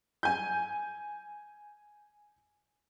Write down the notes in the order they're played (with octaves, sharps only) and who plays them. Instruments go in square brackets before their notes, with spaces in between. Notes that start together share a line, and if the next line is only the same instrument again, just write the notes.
[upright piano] G#5 G6